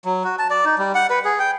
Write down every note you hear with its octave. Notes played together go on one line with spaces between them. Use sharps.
F#3
F#4
A5
D5
D#4
G3
F#5
B4
G#4
G5